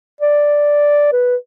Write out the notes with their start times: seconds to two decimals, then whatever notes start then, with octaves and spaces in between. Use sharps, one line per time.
0.20 D5
1.12 B4